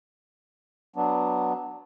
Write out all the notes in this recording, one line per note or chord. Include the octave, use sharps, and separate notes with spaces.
F#3 B3 D4